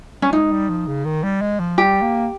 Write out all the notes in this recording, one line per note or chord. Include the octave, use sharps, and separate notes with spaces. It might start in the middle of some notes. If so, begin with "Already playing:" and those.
C#4
G#3 D#4
G3
F3
C#3
D#3
G3
G#3
F3
G3 G4
A#3